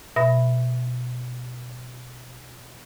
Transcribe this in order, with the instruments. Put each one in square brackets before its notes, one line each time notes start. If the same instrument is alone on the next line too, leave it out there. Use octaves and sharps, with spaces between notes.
[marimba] B2 E5 B5 A#6